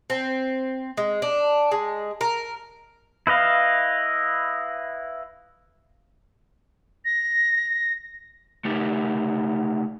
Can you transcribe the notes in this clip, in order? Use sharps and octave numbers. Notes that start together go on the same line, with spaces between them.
C4
G#3
D4
G#3
A#4
E4 B4 D#5 F5
A#6
A3 D#4 G4 A#4